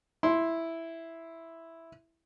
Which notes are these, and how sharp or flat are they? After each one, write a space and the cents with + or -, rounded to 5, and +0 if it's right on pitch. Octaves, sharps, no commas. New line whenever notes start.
E4 +0 C6 +0